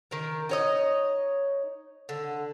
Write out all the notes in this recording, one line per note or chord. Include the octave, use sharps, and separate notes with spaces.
D#3 A#4
D#4 C#5 D#5
D3